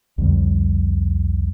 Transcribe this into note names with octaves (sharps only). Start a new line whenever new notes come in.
C2 F2 D3 G3